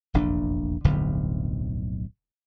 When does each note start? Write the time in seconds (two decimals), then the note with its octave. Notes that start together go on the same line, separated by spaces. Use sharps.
0.14 F1 A#1 E2 D4
0.84 D1 B1 F2 D3